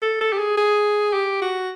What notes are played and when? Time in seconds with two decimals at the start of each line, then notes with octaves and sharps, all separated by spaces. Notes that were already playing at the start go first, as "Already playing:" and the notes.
0.02 A4
0.21 A4
0.33 G4
0.39 G#4
0.57 G#4
1.13 G4
1.41 F#4